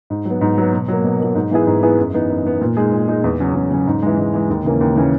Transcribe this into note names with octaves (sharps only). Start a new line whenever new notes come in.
G#2
F#3 B3
G#2
F#3 B3
B2
F#3 A#3
B2
F#3 A#3
G#2
E3 B3 E4 G#4
G#2
E3 B3 E4 G#4
F#2
E3 B3 D#4
F#2
E3 B3 D#4
A#2
G#3 D#4 G#4
A#2
G#3 D#4 G#4
E2
C#3 F#3 C#4
E2
C#3 F#3 C#4
G#2
E3 G#3
G#2
E3 G#3
D#2
C#3 E3 A#3 C#4
D#2
C#3 E3 A#3 C#4